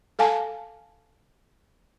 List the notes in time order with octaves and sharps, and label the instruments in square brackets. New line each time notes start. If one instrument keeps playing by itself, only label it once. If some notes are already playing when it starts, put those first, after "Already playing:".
[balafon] A4 F5 G#5 A5